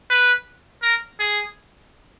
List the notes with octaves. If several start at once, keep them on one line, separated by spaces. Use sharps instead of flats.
B4
A#4
G#4